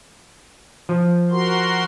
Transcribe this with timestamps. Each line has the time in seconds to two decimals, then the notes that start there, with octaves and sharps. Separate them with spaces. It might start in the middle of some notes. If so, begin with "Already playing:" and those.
0.89 F3
1.30 F#4 A#4 C6